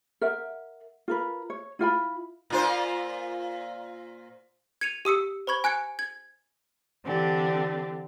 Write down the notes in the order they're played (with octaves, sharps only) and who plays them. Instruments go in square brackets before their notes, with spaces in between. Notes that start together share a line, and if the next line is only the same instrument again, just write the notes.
[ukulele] A#4 D#5 E5 F#5
F4 A#4 B4
C#5
E4 F4 G5 B5
[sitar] A#2 F4 C5
[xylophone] G#6 C#7 D#7 F7
G4 D#6 E6 C#7
C5 B5 C#6 G#6
G#5 F#6 G#6 C#7
G#6
[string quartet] D3 E3 C4 D4 G4